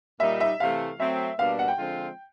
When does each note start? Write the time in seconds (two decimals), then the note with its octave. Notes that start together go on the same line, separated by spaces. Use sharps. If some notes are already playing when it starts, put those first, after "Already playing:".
0.20 A#2 G3 A#3 D#4 E5
0.40 E5
0.60 C3 E3 A3 F5
0.99 F#3 A3 C4 E5
1.39 B2 G3 A#3 D4 F5
1.59 F#5
1.68 G5
1.78 D3 F3 G#3 C4 F4